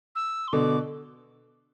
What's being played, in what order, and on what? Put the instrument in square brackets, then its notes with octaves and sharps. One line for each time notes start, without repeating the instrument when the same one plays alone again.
[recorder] E6
C6
[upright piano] B2 D3 [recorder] D6